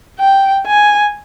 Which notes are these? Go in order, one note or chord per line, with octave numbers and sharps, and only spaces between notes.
G5
G#5